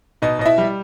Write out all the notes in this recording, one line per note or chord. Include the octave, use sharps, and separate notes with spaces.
B2 D#4 D#5
B2 D#5
E4 E5
G3